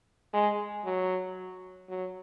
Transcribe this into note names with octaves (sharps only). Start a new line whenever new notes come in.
G#3
F#3
F#3